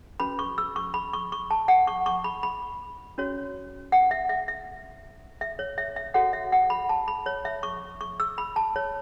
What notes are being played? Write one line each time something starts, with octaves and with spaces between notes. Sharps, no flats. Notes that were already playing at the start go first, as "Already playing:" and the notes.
C#4 F#4 B4 B5
C#6
E6
C#6
B5
C#6
C#6
A5
F#5
C#6
C#6
B5
B5
C#4 F#4 C#5
F#5
E5
E5
E5
E5
C#5
E5
E5
F#4 A4 C#5 F#5
E5
F#5
B5
A5
B5
C#5
E5
C#6
C#6
E6
B5
A5
C#5